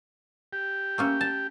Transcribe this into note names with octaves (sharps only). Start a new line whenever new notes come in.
G4
A3 A#3 C#4
A5